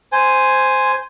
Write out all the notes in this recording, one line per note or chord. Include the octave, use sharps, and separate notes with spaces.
C5 G#5